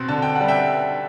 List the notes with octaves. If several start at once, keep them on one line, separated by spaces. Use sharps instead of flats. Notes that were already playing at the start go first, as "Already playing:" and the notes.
Already playing: B2 C4
D3 A5
G5
F#5
G3
E5 G5